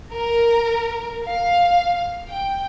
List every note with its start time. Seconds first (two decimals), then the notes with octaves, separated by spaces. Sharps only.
0.11 A#4
1.25 F5
2.29 G5